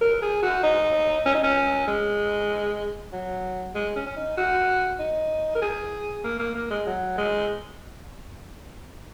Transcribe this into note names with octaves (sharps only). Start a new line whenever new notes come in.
A#4
G#4
F#4
D#4
C#4
D#4
C#4
G#3
F#3
G#3
C#4
C#4
D#4
F#4
D#4
A#4
G#4
A#3
A#3
A#3
G#3
F#3
G#3